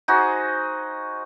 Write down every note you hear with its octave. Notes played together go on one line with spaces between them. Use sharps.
D#4 F#4 G#4 C5